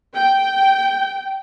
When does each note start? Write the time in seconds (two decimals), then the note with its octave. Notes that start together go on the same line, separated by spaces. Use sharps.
0.15 G5